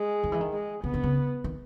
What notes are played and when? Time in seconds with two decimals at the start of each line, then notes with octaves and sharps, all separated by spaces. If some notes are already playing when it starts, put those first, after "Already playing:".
Already playing: G#3
0.24 D#3
0.32 E3
0.41 D#3
0.53 G#3
0.84 C#3 B3
0.94 D3
1.04 C#3
1.44 D#3